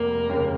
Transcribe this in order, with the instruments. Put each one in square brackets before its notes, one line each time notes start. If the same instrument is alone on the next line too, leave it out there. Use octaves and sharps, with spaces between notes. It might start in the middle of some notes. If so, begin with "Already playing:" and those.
Already playing: [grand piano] F1 [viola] A#3
[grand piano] D#2 C#3